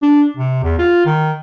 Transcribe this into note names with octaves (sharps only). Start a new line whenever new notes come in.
D4
C3
E2
F4
D#3